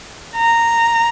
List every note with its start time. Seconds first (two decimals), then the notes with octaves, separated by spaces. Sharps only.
0.35 A#5